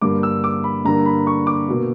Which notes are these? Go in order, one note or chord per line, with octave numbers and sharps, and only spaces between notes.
G2 D3 A#3 D6
E6
D6
B5
G2 D3 A#3 A#5
B5
C#6
D6
B2 A#3